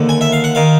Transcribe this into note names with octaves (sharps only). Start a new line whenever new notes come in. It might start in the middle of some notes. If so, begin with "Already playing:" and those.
Already playing: D#2 D3
G#5
E5
F5
F#5
D#3 F5